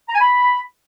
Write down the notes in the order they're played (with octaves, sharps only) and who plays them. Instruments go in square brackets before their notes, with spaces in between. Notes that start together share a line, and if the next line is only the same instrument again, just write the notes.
[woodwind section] A#5
G#5
B5